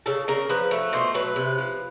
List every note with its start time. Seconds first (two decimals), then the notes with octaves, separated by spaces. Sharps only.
0.06 C#3 A4
0.28 C#3 A#4
0.49 F3 B4
0.71 A3
0.93 B2 C5
1.14 F#3 B4
1.36 C3
1.58 F3